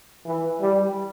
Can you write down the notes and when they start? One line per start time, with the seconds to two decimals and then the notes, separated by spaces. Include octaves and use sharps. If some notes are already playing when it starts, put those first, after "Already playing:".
0.26 E3
0.61 G3